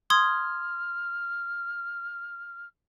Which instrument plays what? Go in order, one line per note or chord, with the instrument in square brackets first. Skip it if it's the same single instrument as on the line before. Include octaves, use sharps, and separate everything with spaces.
[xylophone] C6 D#6 G#6 [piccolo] F6